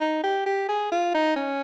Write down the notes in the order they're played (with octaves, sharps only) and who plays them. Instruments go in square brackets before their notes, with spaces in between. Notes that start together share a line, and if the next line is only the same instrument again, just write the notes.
[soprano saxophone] D#4
G4
G4
G#4
F4
D#4
C#4